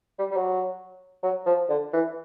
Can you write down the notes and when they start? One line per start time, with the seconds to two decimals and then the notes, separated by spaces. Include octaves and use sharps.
0.19 G3
0.31 G3
0.36 F#3
1.23 F#3
1.46 F3
1.69 D3
1.93 E3